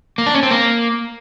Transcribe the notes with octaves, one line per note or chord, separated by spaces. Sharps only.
A#3
D4
C#4
C4
A#3